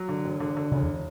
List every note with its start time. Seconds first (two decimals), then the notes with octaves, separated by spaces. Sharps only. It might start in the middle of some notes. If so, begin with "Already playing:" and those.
Already playing: F#3
0.09 D3
0.25 E1
0.40 D3
0.57 D3
0.72 E1 C#3
0.82 E2